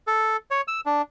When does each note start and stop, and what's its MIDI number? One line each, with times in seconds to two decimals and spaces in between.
0.07 0.37 69
0.51 0.61 73
0.68 0.81 88
0.86 1.02 62